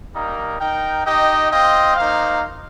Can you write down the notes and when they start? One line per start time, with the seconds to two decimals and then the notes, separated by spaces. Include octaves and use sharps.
0.13 G3 A#3 D#4 A#4
0.59 D#4 A#4 G5
1.05 D#4 G4 D#5 G5
1.51 C4 F4 D#5 G5
1.97 A#3 D#4 C5 F5